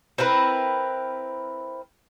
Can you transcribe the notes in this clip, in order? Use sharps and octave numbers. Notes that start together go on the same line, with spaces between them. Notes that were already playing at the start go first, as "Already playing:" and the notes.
C4 E4 A#4 B4